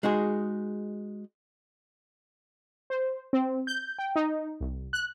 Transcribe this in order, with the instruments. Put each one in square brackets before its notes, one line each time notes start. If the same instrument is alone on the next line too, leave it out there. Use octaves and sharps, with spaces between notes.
[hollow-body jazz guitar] G#3 D#4 F#4 G#4
[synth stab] C5
C4
G6
G5
D#4
C2
F#6